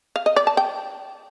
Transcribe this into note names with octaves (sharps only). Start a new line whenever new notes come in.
F5
D#5
D5
A5
G5